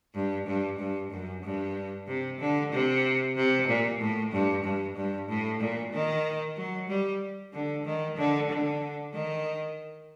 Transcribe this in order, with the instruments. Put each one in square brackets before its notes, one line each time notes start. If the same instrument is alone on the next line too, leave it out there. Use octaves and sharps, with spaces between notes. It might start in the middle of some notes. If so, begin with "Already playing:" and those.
[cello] G2
G2
G2
F#2
G2
C3
D3
C3
C3
A#2
A2
G2
G2
G2
A2
A#2
D#3
F#3
G3
D3
D#3
D3
D3
D#3